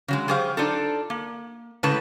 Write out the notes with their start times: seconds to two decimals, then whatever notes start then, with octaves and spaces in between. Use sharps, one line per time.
0.08 C#3 F#3 G#3
0.28 F#3 G4 G#4 C5 F5
0.57 D4 D#4 F4 A4
1.10 A#3
1.83 A2 C#3 G#3 B4 A5